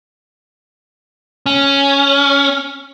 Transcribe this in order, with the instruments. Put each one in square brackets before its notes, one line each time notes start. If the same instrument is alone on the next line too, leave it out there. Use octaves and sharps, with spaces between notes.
[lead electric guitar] C#4